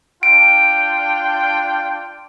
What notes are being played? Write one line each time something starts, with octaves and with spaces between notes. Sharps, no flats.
D4 F4 G5 D7